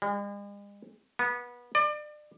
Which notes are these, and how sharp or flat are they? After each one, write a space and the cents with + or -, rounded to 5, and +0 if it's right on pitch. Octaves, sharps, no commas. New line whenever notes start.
G#3 -45
B3 -25
D5 +35